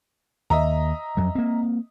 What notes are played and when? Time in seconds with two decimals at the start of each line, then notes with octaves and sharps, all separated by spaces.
0.50 D#2 D#5 E5 A#5
1.17 F2 F#3
1.35 A#3 C4